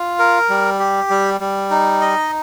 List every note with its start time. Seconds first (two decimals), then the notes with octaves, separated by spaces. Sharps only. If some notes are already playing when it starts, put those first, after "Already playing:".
Already playing: F4
0.19 A#4
0.50 G3
0.79 G4
1.10 G3
1.41 G3
1.70 D#4
2.01 D#5